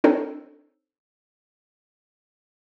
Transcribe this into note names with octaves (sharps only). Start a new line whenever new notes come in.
C4 D4 D#4 A4 C5 C#5